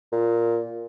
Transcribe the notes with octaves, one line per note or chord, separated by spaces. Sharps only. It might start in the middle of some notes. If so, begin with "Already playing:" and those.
A#2